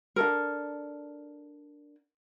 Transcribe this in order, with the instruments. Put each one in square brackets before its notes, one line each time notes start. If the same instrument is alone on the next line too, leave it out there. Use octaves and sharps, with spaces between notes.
[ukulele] D4 A4 A#4